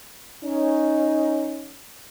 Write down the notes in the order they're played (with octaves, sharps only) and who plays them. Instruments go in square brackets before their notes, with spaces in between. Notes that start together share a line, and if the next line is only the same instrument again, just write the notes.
[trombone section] C#4 D#4